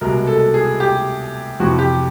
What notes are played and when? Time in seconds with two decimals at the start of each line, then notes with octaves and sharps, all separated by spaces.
0.01 C2 B2 G#3 A#4
0.27 A4
0.54 G#4
0.80 G4
1.60 F2 C3 E3 F#4
1.79 G4